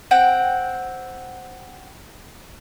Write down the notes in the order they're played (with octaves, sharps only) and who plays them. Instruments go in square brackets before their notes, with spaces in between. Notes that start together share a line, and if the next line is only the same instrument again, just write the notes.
[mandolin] C4 F#5 G5